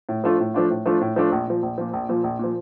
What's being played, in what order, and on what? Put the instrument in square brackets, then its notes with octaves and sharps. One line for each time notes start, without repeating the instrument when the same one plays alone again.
[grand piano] A2
F3 A3 D4 F4
A2
F3 A3 D4 F4
A2
F3 A3 D4 F4
A2
F3 A3 D4 F4
A#1
A#2 F3
A#1
A#2 F3
A#1
A#2 F3
A#1
A#2 F3